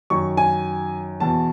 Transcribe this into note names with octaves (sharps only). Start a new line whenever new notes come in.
F#2 D#3 C#6
G#5
E2 B2 A5